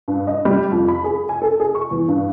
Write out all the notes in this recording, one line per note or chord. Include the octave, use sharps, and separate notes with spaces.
G2
D#5
G3
F2
B5
G#4
G#5
A4
G#4
C#6
E2
G2